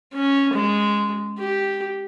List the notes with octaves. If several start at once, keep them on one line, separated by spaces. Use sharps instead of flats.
C#4
G#3
G4